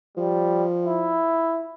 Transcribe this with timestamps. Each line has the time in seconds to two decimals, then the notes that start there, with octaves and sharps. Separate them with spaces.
0.17 F3 G3
0.86 E4